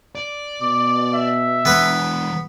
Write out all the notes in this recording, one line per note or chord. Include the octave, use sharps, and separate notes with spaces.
D5
B2 D6
E5
E3 G#3 B3 B4